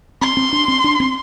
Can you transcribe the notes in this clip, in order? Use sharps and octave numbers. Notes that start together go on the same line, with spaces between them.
C4 C6
C4
D4
C4
D4
C4